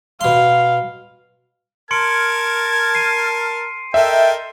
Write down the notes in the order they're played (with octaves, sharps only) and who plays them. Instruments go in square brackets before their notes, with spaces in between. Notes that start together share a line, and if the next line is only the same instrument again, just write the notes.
[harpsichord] B2 C6 [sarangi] F5
[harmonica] A#4 A5 F6 [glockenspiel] C6 C#7 D7 [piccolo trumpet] G#6
[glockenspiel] C7 D#7
[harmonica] A4 A#4 D#5 [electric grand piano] E5 [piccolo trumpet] G5